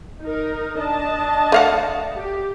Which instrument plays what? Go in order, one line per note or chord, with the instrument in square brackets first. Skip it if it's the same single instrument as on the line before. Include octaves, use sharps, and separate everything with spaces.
[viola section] D#4 A#4
D4 D#5 A5
[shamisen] A3 F5 F#5
[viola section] G4